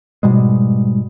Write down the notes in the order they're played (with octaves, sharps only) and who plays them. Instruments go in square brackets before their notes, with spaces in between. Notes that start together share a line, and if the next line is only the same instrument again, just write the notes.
[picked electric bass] G#2 B2 G3 G#3